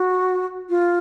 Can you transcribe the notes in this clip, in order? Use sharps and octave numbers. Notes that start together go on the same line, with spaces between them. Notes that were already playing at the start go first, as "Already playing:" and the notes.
Already playing: F#4
F4